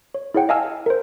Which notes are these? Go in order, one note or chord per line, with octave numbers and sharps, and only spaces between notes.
C#5
E4 G#4 C#5 F#5 G5
D#5 F5 G#5 A5 E6 F6
A#4 C5